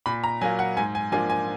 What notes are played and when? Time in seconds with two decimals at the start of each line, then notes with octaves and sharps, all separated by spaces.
0.06 A#2 B5
0.24 A#5
0.41 F#3 A#3 F4 G#5
0.59 F#5
0.77 G#2 G#5
0.95 G#5
1.12 F3 A#3 D4 F4 G#5
1.30 G#5